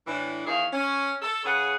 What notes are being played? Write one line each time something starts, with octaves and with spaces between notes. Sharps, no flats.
A2 E3 D4
E2 D#3 E4 G#4 C#5 F5
C#4
A4
C#3 G#4 B4 C#5 F#5